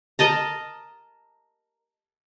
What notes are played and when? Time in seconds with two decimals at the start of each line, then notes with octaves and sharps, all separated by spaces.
0.19 A#4 D#5 A5 A#5